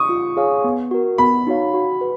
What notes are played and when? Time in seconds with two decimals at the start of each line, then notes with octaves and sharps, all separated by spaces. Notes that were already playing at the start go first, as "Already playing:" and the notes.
Already playing: C#6 D#6
0.09 F4
0.37 G#4 C#5 F5 G#5
0.64 B3
0.91 F#4 A#4
1.18 B3 B5
1.47 D#4 F#4 C#5 F5
1.74 F#4
2.01 B4